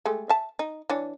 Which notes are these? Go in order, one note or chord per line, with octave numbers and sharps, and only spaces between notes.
G#3 A3 G4
E5 A5
D#4
E3 D4 C#5